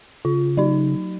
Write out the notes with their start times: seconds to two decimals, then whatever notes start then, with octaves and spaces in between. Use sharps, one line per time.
0.25 C#3 F4
0.57 F#3 D#4